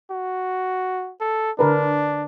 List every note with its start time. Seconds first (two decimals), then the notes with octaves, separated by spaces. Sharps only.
0.11 F#4
1.20 A4
1.59 D3 D4 A#4 B4